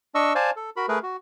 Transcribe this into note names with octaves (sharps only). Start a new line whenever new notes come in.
D4 D#5 C#6 E6
C5 D5 F5 G#5 A5
A4
F#4 A#4 B5
A3 G#4 A#4 B4
F#4